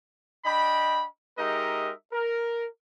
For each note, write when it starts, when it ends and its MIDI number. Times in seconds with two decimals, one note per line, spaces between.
0.46 1.05 62
0.46 1.05 75
0.46 1.05 79
0.46 1.05 83
1.38 1.92 56
1.38 1.92 63
1.38 1.92 67
1.38 1.92 70
1.38 1.92 75
1.38 1.92 76
2.12 2.66 70